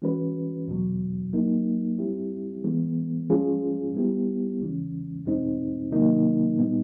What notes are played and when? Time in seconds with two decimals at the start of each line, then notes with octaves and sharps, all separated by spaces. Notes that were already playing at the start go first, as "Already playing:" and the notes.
0.02 E3 G#3 C#4 F#4 B4
0.68 E2 B2 F#3
1.33 F#3 A#3 D#4
1.98 G3 C4 E4 G4
2.64 E3 G#3 B3
3.30 F3 G#3 C#4 F4 G#4
3.95 G3 B3 E4 G4
4.60 E2 C#3 E3 G#3 C#4
5.26 E2 B2 G#3 C4 D#4
5.91 C3 D#3 F#3 A#3 D#4
6.57 A#2 G3 B3 D#4